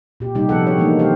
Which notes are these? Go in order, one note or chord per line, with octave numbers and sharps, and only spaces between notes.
A#2 G4
C3 G3 D#4 G4
C3 F3 B3 G#4 A4 F#5
D4 A4 C#5
E3 G#3 A#3 B3 D4 D#4
D3 A3 C4 G4 C5 F5